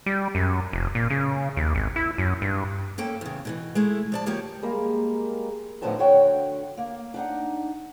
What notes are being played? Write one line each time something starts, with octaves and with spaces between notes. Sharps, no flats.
G3
F#2
F1
A#2
C#3
D#2
G#1
E4
F#2
G2
A#3 C#4 A4 G5
E2 C#3
B2 D3 E3
G#3 A3 E4
F3 D5 A5
D2 F3 A#3 G4 C#5
G3 G#3 A#3 A#4
A2 D3 F3 B3 D#4 A5
D3 F#4 C#5 G5
A#3
D4 D#4 F#5